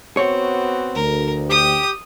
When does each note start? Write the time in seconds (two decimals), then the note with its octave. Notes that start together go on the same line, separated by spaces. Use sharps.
0.17 B3 C4 F#4 C#5
0.95 D2 A#4
1.50 G4 D#6